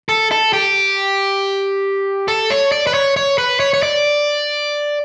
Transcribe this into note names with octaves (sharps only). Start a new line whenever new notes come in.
A4
A4
G4
A4
C#5
D5
B4
C#5
C#5
B4
C#5
C#5
D5